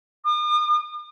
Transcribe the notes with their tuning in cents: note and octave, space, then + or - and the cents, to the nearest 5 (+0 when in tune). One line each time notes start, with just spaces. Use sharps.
D#6 -45